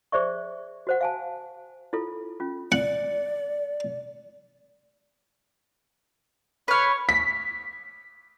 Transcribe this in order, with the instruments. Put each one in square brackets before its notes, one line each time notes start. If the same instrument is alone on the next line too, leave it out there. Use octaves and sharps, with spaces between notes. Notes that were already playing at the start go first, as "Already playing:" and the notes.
[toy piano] G#4 C5 D5 E5 C#6
F#4 C5 F#5
F5 G#5 A5
E4 F4 A4
C#4 F4
[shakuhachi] D5 [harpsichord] F#5
[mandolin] B4 F6 [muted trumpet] C#5
[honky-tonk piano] B6